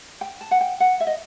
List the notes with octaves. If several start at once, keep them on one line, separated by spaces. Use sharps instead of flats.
G5
A5
F#5
G5
F#5
E5
D#5